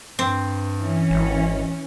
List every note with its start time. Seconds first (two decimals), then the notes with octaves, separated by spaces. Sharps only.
0.19 G2 C4
0.80 E3 C#4
1.10 G#1